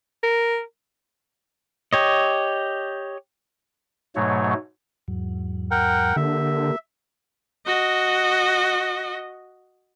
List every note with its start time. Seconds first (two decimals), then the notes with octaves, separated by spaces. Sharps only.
0.23 A#4
1.93 G4 C#5 D#5
4.16 G#2 B2 F#3 A3 C#5
5.08 E2 G#2 F#3
5.71 A#4 F#5 G5
6.16 D3 A#3 G4 A#4 E5
7.66 F#4 D#5